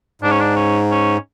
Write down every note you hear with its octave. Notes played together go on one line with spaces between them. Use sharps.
G#2 D4
C#4
D4
C#4
C#4